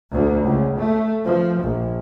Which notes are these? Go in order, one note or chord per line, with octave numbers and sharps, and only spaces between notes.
D2
C#2
A3
F3
A#1